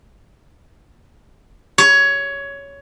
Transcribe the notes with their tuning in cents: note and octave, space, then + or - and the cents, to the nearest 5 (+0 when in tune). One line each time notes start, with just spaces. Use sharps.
C#5 +15